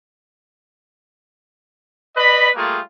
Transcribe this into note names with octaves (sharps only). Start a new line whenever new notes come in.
B4 D5 D#5 B5
G3 A3 A#3 F4 G#4